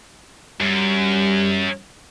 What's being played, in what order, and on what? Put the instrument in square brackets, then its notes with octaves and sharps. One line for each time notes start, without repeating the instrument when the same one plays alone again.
[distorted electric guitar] F#2 [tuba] G3